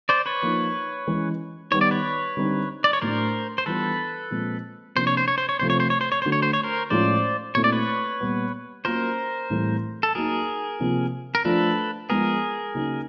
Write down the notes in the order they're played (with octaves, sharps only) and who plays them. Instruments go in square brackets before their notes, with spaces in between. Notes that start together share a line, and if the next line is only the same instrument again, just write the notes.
[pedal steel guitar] C5 D5
B4 C#5
[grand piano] F3 A#3 D#4
E3 G#3 C#4
[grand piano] D#3 G3 B3 [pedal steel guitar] C#5
[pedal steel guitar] D5
B4 C#5
[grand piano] D3 G3 C4 D#4
[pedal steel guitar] D5
C#5
[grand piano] A2 F#3 A3 D4 [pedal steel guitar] A#4 C5
[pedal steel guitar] C5
[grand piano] E3 G3 B3 D4 F4 [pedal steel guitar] A4 B4
[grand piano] A#2 F3 G#3 C4
[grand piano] C3 F3 A#3 D4 F4 [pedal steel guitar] C5
[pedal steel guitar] C#5
C5
C#5
C5
C#5
[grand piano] C3 F3 A3 C4 [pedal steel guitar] C5
[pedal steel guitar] C#5
C5
C#5
C5
C#5
[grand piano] D3 F#3 A3 [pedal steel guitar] C5
[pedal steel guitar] C#5
C5
C#5
A#4 C5
[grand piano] A2 F3 G#3 C#4 F4 [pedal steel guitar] C5 D5
[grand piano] A#2 F#3 A3 C4 E4 [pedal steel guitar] C#5
[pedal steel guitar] D5
B4 C#5
[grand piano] A#2 G3 B3
[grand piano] F#3 A#3 C#4 F4 [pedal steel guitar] A#4 C5
[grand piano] A2 E3 G3 C4
[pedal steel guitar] A4
[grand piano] F#3 A#3 D#4 [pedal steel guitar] G#4 A#4
[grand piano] C3 F3 A#3
[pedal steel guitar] A#4
[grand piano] F3 A3 D4 F4 [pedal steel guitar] A4 B4
[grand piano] F3 G#3 B3 [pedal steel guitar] G#4 A#4
[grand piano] C#3 F#3 A#3 D#4